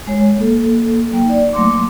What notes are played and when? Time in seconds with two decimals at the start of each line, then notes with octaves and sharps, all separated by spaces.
0.07 G#3 C#5
0.38 A#3 A4
1.11 F#3 A#3 G5
1.25 D#4 D5
1.53 F#3 A3 A#3 C6 D6